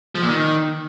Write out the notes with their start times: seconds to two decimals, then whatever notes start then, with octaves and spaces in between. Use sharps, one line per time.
0.15 F3
0.22 A#2
0.30 D#3